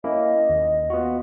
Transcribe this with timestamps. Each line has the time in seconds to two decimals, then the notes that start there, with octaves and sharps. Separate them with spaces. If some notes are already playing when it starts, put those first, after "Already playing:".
0.04 A#3 C#4 E4 D#5
0.49 D#2
0.90 B3 F4 F#4